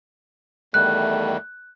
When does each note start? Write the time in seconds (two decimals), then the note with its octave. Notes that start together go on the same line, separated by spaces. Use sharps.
0.74 E2 D#3 G3 A3 F#6